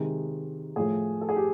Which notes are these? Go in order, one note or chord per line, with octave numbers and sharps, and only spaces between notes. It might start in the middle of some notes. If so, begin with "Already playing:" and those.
Already playing: C3 D#3 G#3
A2 F3 A3 G#4
A4
G#4
G4